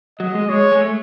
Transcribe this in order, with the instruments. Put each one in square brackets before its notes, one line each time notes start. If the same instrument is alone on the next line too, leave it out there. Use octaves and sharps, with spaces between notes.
[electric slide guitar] F#3 [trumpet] D#5
[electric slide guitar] G#3
[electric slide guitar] G#3 [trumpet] C#5
[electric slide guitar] G#3
A3